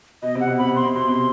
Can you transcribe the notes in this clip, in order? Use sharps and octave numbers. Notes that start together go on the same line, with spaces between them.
B2 D#5
C3
F#5
B2
C3 B5
B2 C6
C3
B2 C6
C3